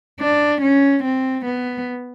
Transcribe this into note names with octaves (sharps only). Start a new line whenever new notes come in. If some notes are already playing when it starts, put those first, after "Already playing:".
D4
C#4
C4
B3